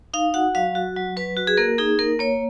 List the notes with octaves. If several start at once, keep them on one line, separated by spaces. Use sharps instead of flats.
D#4 F5
F#4 F#5
F#3 F5
F#4
F#3
F#3 B4
F#4
G#4
A#3 A#4
D#4 G#4
A#3 A#4
A#3 C#5